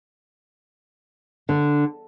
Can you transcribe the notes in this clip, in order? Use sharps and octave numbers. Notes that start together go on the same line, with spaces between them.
D3